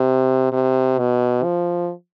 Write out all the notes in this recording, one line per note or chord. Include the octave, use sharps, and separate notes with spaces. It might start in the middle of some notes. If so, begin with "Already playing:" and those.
Already playing: C3
C3
B2
F3